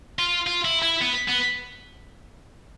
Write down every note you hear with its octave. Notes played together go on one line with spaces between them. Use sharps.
F4
F4
E4
E4
B3
B3